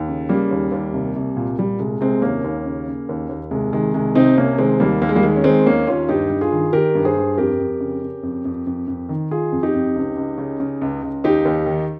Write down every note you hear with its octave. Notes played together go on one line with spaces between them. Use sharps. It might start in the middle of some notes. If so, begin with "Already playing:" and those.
Already playing: D#2
C#3
C#3 G3 A#3
D#2
D#2
C2
C2
A#2
A#2 G3
C2 G#3
C2 G#3 C4
D#2 A#3 C#4
D#2
C#3
C#3
D#2
D#2
C2 G#3
D#3 G#3
C2 G#3
C3 C4 D#4
C2 A#3 C#4
D#3 G#3 C4
D#2 G3 A#3
D#2 A#3
G#3
G3 A#3
D#3 G#3
C#4
D#3 G#3 C4
D#2 A#3 C#4
D#2 C#4 F4
G2 D#4 G4
G2
F4 G#4
D#3
D#3 G4 A#4
G2
G#4 C5
G2
F2 G4 A#4
F2
C#3
C#3
F2
F2
F2
F2
D#3
D#3 F4 G#4
F2
D#4 G4
F2
C#2
C#2
C#3
C#3
C#2
C#2
D#2 D#4 G4
D#2
D#3